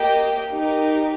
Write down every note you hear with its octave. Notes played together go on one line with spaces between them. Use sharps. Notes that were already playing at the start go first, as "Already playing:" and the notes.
Already playing: A#3 G4 D#5 G5
D#4 G4 A#4